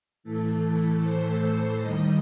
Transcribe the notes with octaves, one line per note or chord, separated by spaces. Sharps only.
A2 E3 A3 A4
C5
D#2 D#3 G3 D#5